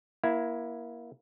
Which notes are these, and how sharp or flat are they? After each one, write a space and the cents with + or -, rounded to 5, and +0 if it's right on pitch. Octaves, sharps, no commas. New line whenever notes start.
A#3 +25 E4 +5